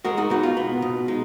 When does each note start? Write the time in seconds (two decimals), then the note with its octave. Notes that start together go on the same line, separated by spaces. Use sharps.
0.05 G#3 F#4 A#4
0.17 D#4 F#4
0.30 B2 D#4 F#4
0.43 F4
0.57 B3
0.82 B2
1.08 G#3 D#4